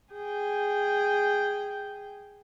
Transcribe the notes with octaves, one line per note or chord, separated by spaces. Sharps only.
G#4 G5